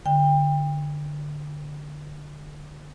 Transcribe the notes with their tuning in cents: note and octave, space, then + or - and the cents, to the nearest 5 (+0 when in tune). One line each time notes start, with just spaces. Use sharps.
D3 +10 G5 +30